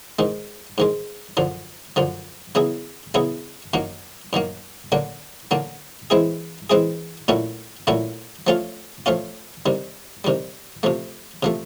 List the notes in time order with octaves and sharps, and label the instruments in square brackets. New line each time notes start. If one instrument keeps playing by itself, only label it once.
[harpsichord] G#2 D#3 G#3
G#2 D#3 G#3
F#2 D3 F3
F#2 D3 F3
C#3 F#3 B3 E4 G#4
C#3 F#3 B3 E4 G#4
F#2 D#3 F#3 A#3
F#2 D#3 F#3 A#3
D3 F#3 A#3 D4
D3 F#3 A#3 D4
E3 G#3 C4 E4 G#4
E3 G#3 C4 E4 G#4
A#2 F#3 A3 C#4 E4
A#2 F#3 A3 C#4 E4
F3 A3 C#4 F4
F3 A3 C#4 F4
C3 D#3 G3
C3 D#3 G3
C3 F3 A3
C3 F3 A3